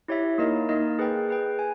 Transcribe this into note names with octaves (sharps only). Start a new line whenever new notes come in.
E4 G4 C#5 E5
A#3 D#4 A#4 D#5
A#3 D#4 A#4 D#5
G#4 B4 G5
G#4 B4 G5
G#5